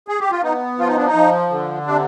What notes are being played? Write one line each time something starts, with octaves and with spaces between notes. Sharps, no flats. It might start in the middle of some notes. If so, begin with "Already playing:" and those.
G#4
G4
F4
B3 D#4
F3 F4
D#4
D4
D#4
F3
D3
C3 D4